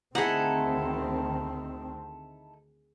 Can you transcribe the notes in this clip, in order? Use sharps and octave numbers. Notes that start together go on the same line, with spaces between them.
D2 D#3 C4 D#4 E4 G#4 A4 F#5